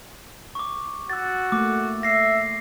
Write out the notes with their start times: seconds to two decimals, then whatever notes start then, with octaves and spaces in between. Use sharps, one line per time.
0.55 C#6 D6
1.10 F#4 E6 A6
1.52 A3 A#3 D6
2.03 E5 A#6 C7